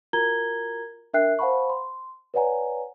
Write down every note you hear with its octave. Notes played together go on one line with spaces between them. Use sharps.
F4 F#4 A#4 A#5 G#6 G7
D4 A#4 E5 G5 F#6 C7
C5 F5 F#5 A5 B5 C#6
C6
B4 C#5 D5 F#5 G#5 A#5